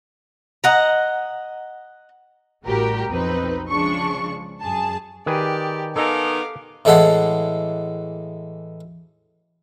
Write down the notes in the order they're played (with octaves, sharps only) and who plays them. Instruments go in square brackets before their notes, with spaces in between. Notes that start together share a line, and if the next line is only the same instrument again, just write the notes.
[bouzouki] D#5 F#5 A#5
[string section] A1 A2 G3 F#4 G4 A#4
B1 F2 C4 D#4 B4
C#3 F3 G#3 D4 C#6
F#2 G#4 A5
[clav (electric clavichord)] D#3 G#4 B4 [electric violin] G4 D5
[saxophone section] D#3 B3 D#4 [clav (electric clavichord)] A4 G#5 [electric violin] F5 D6
[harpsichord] A2 E3 G#3 A4 F#5 C6